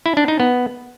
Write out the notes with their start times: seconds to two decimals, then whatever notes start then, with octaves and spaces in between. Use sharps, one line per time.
0.06 E4
0.17 D4
0.28 D#4
0.40 B3